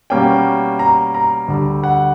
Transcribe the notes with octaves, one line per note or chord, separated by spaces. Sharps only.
B2 G3 A#3 C#4 G5
A#5
A#5
D2 D3 G3
F#5